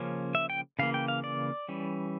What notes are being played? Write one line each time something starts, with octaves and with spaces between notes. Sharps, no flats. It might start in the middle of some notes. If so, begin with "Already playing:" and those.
Already playing: C#3 F3 A#3 C#4
E5
G5
C#3 E3 A#3 F5
G5
F5
D5
E3 G3 C#4